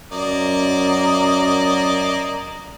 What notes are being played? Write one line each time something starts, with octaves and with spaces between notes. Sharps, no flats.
F#2 A#3 D5 D#5